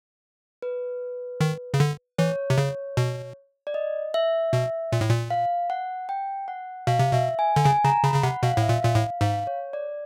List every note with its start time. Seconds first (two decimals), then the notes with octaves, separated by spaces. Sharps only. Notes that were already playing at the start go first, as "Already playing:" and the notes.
0.62 B4
1.41 D#3
1.74 C#3
1.80 D3
2.18 E3 C#5
2.50 C3
2.58 C#3
2.97 B2
3.67 D5
3.74 D#5
4.14 E5
4.53 B2
4.92 A#2
5.01 A2
5.10 A#2
5.31 F5
5.70 F#5
6.09 G5
6.48 F#5
6.87 B2 F5
6.99 C3
7.13 B2 E5
7.39 G#5
7.56 D3
7.65 C#3 G#5
7.84 C#3 A#5
8.04 C#3 B5
8.14 C#3
8.23 C3 F#5
8.43 B2 F5
8.57 A2
8.62 E5
8.69 A#2
8.83 A#2 F5
8.95 A2
9.21 G#2 F5
9.47 C#5
9.73 D5